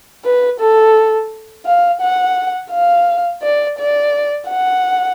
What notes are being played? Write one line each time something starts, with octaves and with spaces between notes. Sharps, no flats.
B4
A4
F5
F#5
F5
D5
D5
F#5